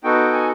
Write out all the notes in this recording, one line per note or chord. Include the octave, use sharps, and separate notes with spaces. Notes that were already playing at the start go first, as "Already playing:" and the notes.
B3 D#4 F#4 A4 G5
G#5